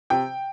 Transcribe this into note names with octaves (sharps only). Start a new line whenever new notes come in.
C3 G5